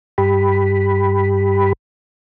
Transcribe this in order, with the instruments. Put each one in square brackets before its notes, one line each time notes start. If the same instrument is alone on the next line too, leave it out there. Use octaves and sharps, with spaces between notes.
[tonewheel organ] G2 G4 B5